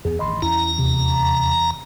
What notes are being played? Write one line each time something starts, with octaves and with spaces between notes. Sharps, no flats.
E2 B3 G#4
A1 G2 D#3 D#5 B5 C6
E2 C#4 E4 A#5
D#2 C3